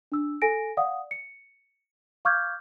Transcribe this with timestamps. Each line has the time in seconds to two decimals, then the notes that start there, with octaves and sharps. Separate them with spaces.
0.12 D4 E6
0.42 A4 G#5 A#6 D7
0.77 D5 F5 F#5 D#6
1.11 C#7
2.25 F5 C#6 D6 F6 G6 G#6